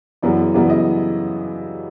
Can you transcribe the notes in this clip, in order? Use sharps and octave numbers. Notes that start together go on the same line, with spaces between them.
F#2 C#3 E3 G3 B3 D5
F#2 C#3 E3 G3 B3 D5
D#5